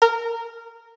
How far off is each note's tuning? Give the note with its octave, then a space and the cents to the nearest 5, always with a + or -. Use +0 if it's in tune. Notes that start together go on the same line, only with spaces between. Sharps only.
A#4 -15